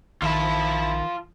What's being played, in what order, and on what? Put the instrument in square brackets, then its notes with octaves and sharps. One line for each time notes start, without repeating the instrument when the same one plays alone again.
[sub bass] A#1 [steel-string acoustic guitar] D#3 [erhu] E4 [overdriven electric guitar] F4 A5